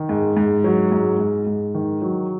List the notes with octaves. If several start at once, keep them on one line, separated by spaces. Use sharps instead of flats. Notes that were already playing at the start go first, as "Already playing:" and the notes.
Already playing: D#3
G#2
G#2
F#3
G#2
G#2
G#2
D#3
F#3